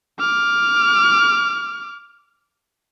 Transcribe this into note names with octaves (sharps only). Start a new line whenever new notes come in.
D6 F6